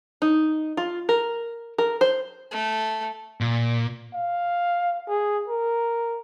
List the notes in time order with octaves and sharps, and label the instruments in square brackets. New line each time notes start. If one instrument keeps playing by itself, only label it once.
[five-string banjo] D#4
F4
A#4
A#4
C5
[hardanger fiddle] A3
[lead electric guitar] A#2
[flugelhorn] F5
G#4
A#4